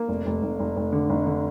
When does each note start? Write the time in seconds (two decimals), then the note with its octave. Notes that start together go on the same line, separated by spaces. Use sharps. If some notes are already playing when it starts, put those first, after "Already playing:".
Already playing: A#3
0.08 F1
0.26 F1
0.43 F1
0.59 F1
0.76 F1
0.93 D3
1.10 F1
1.26 D3